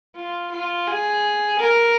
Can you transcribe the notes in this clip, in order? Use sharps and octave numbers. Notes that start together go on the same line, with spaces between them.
F4
F4
G#4
A#4